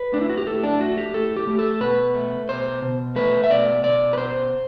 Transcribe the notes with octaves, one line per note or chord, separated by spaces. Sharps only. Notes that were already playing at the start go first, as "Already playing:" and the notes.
Already playing: B4
A2 D4
E4
F#4
G4
A2 A4
D4
A3 F#4
G4
A2 A4
G4
A3
A4
B2 B4
A3
B2 C5
B2
A3 B4
E5
B2 D5
B2 D5
B4
B2 C5